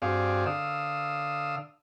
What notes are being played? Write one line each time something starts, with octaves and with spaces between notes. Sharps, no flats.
G2 C4 F#4 G#4 D5 F5
D3 F5 D#6 E6